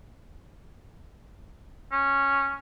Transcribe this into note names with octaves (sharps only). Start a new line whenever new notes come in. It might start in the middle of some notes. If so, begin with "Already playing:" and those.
C#4